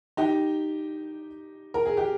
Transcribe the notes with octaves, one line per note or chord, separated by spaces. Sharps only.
D#4 G4
A#4
G#4
G4